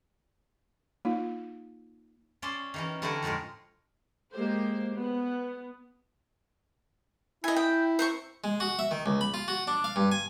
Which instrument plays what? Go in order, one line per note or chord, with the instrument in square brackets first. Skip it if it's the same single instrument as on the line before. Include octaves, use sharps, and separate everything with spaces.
[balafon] A#3 D#4 F4
[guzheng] C#4 D5 E5 C6
D#3 E3 C#4
D3 C4 E4 F#4 A#4 G#5
F2 A2 G#3 G#4 A#4
[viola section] G#3 A#3 G4 C5
B3
[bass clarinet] E4 [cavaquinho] D#5 G#5
[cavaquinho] G5
C5 C6 C#6
[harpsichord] G#3
F#4
E5
D#3
C#2
B5
F4
F#4
D4
F5
G2
G#5